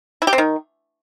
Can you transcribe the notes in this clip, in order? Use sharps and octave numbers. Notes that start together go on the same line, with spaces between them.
E4
G4
C4
D#3